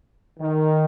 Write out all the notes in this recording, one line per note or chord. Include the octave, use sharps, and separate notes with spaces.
D#3